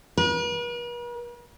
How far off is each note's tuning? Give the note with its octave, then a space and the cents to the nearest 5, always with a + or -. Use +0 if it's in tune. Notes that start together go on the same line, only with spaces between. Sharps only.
B4 -45